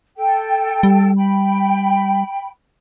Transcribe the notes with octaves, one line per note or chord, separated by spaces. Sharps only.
A4 G5
G3
G5 B5